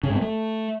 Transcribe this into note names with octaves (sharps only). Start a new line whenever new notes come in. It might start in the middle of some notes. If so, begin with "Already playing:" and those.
C#3
G#2
B3
A3